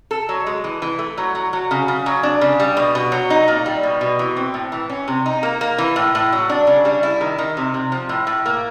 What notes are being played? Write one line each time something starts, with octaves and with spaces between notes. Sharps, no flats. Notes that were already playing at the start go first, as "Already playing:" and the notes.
A4
F#3
G#3
E3
E3
A3
F#3
F#3
F#3
C#3
C#3
F#3
D4
C#3
G3
B2
B2
F#3
D#4
A#2
G3
B2
B2
E3
C4
A2
E3
C#4
C3
D#4
A#3
A#3
E3
A2
A2
F#3
D4
C#3
G3
E4
D#3
D#3
C3
C3
F3
A2
A2
A#3